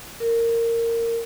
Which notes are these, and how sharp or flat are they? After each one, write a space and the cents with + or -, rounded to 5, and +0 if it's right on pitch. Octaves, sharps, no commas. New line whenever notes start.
A#4 -15